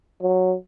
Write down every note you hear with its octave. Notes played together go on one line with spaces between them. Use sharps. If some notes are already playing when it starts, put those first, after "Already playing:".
F#3